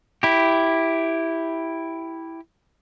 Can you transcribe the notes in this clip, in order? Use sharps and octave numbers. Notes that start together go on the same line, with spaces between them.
E4 G4